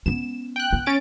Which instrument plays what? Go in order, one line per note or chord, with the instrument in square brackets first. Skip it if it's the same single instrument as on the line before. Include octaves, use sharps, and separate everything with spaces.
[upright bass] B3 C#4 [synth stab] E7
[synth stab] G5 F#6
[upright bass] B3
[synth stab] C#4 A6 D7